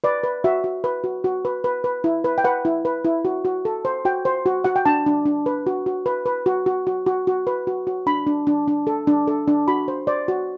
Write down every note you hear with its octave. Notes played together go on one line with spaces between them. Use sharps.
B4 D5
B4
F#4 E5
F#4
B4
F#4
F#4
B4
B4
B4
E4
B4
G5
B4 F#5
E4
B4
E4
F#4
F#4
A4
C5
F#4 G5
C5
F#4
F#4 F#5
G5
D4 A5
D4
D4
B4
F#4
F#4
B4
B4
F#4
F#4
F#4
F#4
F#4
B4
F#4
F#4
D4 B5
D4
D4
D4
A4
D4
A4
D4
F#4 B5
C5
C5 D5
F#4